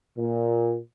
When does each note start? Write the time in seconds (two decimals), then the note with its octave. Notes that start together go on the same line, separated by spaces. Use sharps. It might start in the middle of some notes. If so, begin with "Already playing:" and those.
0.18 A#2